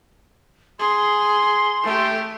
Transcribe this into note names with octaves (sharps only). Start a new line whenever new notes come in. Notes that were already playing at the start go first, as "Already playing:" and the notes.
G#4 C6
A3 G4